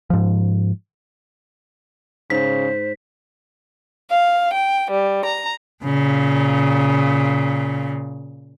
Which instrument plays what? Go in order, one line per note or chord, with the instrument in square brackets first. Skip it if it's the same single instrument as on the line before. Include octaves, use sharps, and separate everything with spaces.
[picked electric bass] G#2 F3
[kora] G#2 [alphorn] C#3 [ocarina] C5 [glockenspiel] B6
[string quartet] F5
G5
G3
A#5
[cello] A#2 C#3